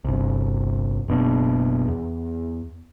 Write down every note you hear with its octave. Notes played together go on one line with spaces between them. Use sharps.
G1 C2
F#1 B2 D4
E2